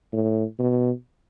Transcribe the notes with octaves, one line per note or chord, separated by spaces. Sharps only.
A2
B2